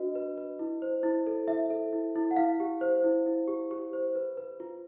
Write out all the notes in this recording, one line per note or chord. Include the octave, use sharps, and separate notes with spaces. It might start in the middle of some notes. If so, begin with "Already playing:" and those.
Already playing: D4 F#4 B4 D#5
B4
B4
E4
C5
E4
A4
E4 E5
A4
E4
E4
F#5
E4 F5
G4
C5
E4
E4
G4
G4
C5
B4
B4
F4